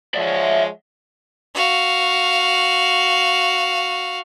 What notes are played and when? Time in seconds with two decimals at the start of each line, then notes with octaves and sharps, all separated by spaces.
0.14 F3 G#3 C#5 D5 E5
1.55 F#4 F5